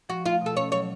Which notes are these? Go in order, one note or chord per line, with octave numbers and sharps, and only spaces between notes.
F3 F#4
A3 F4
B2 A4
C#4 C#5
F#3 C#5